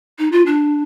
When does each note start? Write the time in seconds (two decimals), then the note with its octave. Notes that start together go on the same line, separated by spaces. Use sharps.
0.18 D#4
0.32 F4
0.46 D4